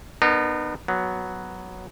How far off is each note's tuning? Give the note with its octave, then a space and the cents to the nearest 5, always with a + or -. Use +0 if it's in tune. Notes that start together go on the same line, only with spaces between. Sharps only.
B3 +0 D#4 -40 A#4 -5
F#3 +0 B3 +0